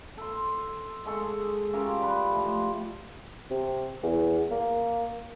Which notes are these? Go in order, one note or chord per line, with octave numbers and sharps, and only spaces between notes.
A4 C6
G#3 G#4 A4 C#6
C#4 F4 G4 A#4
B4 D5
A2 F3
C3
E2
A#3